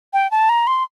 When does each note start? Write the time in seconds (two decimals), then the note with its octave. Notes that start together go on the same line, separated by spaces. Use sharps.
0.13 G5
0.31 A5
0.49 A#5
0.67 C6